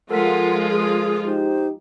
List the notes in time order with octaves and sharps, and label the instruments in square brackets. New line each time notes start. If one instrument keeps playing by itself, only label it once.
[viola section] F3 G#3 F4 [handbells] A4 A#4 B6 [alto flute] F#5
[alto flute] G#4
[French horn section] D#4 G4 [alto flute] C5